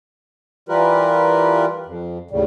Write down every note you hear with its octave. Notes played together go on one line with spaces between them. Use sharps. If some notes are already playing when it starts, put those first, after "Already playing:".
E3 G3 F4 G4 A#4 B4
F2
D#2 A2 C#3 G3